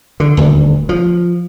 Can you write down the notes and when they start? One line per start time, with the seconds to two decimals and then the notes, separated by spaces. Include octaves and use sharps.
0.20 D3
0.37 D#1 D2
0.89 F3